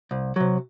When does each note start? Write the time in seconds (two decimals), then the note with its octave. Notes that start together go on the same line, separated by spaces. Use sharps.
0.11 C2
0.36 C3 F#3